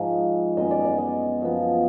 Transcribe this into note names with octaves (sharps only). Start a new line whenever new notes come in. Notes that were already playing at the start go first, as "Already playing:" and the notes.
Already playing: G#2 F3 G#3
F#2 D#3 G#3 B3 D#5
D5
D5
D#5
F#2 F3 B3